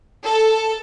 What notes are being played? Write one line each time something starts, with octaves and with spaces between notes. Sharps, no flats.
A4